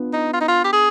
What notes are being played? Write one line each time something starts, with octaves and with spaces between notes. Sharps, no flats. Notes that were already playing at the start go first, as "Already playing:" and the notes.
Already playing: B3 D4 F4
D#4
F4
D#4
F4
G4
G#4